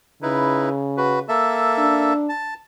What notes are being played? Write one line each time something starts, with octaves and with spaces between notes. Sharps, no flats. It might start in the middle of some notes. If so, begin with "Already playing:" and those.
C#3 D#4 E4 B4
F#4 B4
A#3 A4 E5
D4
A5